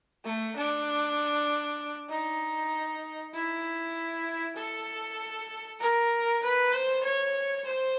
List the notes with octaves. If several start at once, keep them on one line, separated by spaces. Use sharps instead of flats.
A3
D4
D#4
E4
A4
A#4
B4
C5
C#5
C5